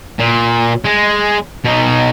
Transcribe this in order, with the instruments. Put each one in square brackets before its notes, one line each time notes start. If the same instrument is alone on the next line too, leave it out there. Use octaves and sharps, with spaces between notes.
[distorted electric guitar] A#2
G#3
B2 D#4